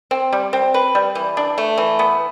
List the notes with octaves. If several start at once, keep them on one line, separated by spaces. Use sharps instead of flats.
C4
G3
C4
B4
G3
E3
D4
A3
E3
B3